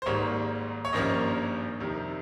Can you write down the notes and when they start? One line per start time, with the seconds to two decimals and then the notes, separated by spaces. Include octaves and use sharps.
0.02 C5
0.06 G#1 G#2 G3 A#3 C#5
0.85 C#5
0.93 G#1 G2 F3 A#3 C#4 D#5
1.80 F2 C3 D#3 G3